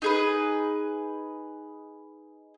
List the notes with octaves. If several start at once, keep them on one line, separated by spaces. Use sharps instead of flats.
D#4 G#4 B4